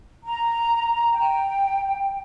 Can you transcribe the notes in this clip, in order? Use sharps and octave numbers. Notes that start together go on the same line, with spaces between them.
A#5
G5